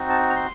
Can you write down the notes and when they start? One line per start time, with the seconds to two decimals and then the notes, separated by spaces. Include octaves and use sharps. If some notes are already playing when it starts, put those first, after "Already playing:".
Already playing: C4 D#4 F#4
0.10 A5
0.30 A#5
0.36 C6